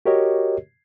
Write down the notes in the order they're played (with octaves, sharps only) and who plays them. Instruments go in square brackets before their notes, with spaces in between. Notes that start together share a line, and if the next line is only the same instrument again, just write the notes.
[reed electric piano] F#4 G4 A#4 C#5 D#5